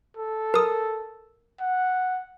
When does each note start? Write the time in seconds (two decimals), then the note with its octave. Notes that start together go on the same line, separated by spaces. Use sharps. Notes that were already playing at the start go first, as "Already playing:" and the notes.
0.17 A4
0.54 A#4 D#6
1.61 F#5